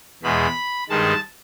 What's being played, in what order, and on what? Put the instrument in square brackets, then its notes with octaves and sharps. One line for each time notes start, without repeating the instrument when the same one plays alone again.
[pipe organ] E2 B2 G#3 B5
G2 D#3 G#3 A5